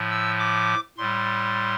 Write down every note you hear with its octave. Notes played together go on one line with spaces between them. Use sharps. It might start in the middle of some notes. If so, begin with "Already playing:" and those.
Already playing: A2 F3
E6
D6
A2 G3 C6